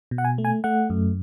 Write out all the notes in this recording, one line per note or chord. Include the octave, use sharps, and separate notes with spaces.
B2
F#5
G#5
A3
G#5
A3 F#5
F#2